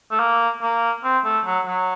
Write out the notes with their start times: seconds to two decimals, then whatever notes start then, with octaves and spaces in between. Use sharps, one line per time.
0.11 A3
0.20 A#3
0.62 A#3
1.04 C4
1.24 A3
1.45 F#3
1.66 F#3